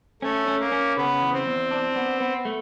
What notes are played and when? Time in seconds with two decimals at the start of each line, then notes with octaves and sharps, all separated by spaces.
0.22 A3 C#4
0.47 C#4
0.59 A#3
0.72 C#4
0.97 C#3 B3
1.21 E2
1.33 C4
1.46 E2
1.71 D4
1.96 B3
2.20 B3
2.45 A3